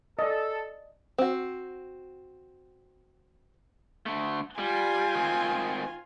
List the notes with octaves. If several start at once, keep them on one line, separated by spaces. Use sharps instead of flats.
A4 D5 D#5
C4 F#4
D3 A3
G3 F4 G#5
D#3 C4